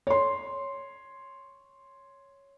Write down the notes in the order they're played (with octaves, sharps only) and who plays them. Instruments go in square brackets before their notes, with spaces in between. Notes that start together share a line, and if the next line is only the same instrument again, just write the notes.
[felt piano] C#5 C6